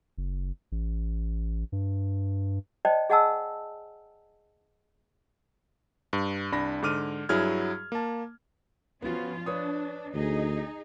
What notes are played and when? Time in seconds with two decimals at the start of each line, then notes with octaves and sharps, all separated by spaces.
0.18 F#1
0.72 A1
1.72 G2
2.85 C5 D5 D#5 G5 A5
3.10 G#4 D#5 F#5 G#5 A5 E6
6.13 G2
6.52 C2 D4 B5 A#6
6.82 G#2 D3 D6 F6 D#7
7.29 G2 F#3 E4 G#4 F6 G#6
7.92 A#3 A5
9.02 F3 B3 C#4 F4 F#4
9.46 D4 B4 C#5 D#6
10.14 D2 D#4 G#4 D#5